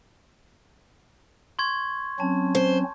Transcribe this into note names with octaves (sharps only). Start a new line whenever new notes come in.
C6 C#6 G#6
F#3 C4 C#4 A5
C5